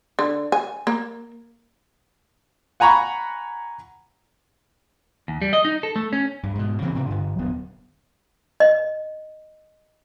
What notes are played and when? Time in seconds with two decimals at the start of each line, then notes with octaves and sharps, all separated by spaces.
0.19 D3
0.52 G#5
0.87 A#3
2.80 F#5 G#5 A#5 B5 C#6
5.28 D#2
5.42 G3
5.53 D#5
5.65 D#4
5.83 A4
5.96 A3
6.13 C#4
6.43 G2
6.55 G#2 B2
6.82 C#3 E3 A#3 C4
6.94 A2 C3 A#3
7.10 G2 D3
7.39 D#1 G2 F#3 B3
8.60 D#5